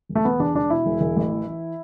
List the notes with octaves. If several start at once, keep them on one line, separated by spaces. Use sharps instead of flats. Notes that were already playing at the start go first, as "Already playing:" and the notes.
E1
A3
E1 B3
E2 D4
E1 D4
B2 E4
E1
E1
A1
E3
E3